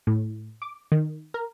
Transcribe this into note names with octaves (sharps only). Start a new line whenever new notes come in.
A2
D6
D#3
A#4